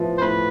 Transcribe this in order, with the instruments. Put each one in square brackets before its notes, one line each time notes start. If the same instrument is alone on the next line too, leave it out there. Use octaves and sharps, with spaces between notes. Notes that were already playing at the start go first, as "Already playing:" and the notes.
Already playing: [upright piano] A2 F3 B3 E4
[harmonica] C5
[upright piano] A2 [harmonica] B4